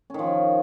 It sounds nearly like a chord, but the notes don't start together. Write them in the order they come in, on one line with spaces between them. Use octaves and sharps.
C#4 D#3 F3